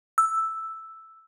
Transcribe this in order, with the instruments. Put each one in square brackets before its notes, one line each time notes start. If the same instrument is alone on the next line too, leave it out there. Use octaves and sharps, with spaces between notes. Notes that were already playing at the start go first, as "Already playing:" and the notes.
[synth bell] E6